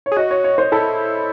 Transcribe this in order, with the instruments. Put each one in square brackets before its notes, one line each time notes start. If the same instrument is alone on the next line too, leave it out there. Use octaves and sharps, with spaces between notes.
[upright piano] C#5
[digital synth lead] G#4
[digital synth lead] F#4 [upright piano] D#5
[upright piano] C#5
C#5
C5
[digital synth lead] E4 [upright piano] A4